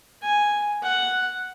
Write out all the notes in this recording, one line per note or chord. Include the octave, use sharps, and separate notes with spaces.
G#5
F#5